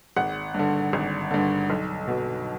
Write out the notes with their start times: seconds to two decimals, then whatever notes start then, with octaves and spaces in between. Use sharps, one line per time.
0.16 G#1 F#5
0.54 G2 D3
0.93 G#1
1.31 G2 D3
1.70 B1
2.08 B2